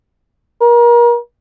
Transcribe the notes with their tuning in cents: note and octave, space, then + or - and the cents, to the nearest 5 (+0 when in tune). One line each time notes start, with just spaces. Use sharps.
A#4 +35